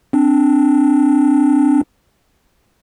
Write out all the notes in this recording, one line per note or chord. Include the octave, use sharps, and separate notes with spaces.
C4 D4